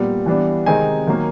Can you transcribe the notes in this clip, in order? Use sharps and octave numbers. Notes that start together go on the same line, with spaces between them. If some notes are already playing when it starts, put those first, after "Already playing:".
Already playing: A#2 G3 B3
E3 G3 B3 D4
C3 D#3 G#3 C4 D#4 G#5
D#3 F#3 A#3